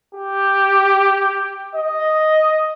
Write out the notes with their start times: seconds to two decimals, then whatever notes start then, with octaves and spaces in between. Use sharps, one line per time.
0.15 G4
1.75 D#5